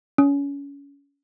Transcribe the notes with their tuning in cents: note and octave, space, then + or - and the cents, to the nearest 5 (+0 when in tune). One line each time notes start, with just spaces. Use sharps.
C#4 +25